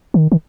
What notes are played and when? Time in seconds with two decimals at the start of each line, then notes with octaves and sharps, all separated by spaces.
0.14 D#3
0.32 D#3